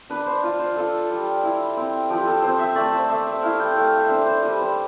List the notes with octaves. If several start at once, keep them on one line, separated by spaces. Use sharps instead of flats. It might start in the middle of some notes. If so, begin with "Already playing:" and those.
D4 B4
C5
F4
C5
F4 A4
G3
E4
C4
F3 G4
A4
C4 C5
E5
A3 D5
C5
A3 E5
E5
E4 F5
G5
A3 F5
E5
D4 C5
C5
G3 B4
C5